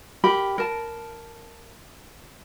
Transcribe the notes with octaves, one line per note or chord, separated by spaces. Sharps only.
G4 A#4 B5
A#4 A5